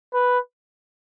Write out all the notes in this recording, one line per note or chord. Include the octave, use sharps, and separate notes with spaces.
B4